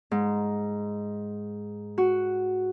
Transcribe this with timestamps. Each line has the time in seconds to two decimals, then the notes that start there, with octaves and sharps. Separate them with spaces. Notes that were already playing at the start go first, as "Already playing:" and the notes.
0.11 G#2
1.98 F#4